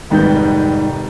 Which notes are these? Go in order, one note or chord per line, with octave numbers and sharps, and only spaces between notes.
F1 G#2 D#3 G3 B4 G6